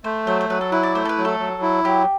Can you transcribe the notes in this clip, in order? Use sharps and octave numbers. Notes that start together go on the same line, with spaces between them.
A3 C5
F#3 C5
C5
F#3 B4
A4
E4 B4
D5
A3 C5
A4
B4
F#3
A4
F#3
E4
F#3 G4